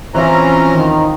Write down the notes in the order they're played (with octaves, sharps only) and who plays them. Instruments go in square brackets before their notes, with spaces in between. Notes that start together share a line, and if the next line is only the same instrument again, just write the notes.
[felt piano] E3 C4 E4 [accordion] C#4 A#5 [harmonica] F4 C5
[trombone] D#3